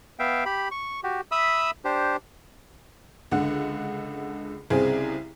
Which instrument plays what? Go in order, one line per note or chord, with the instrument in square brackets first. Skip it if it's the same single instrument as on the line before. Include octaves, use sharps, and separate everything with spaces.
[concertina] B3 E5 F5 G5
G4 B5
C#6
F#4 G4
E5 B5 D#6 E6
D4 G4 C5
[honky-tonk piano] C#2 D3 F#5
C2 C#3 C4 G#4